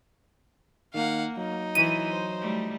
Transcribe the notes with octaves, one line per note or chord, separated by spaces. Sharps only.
D#3 A#3 F5 F#5
F#3 D#4
E3 E4 C5 D#7
C5
G3 A3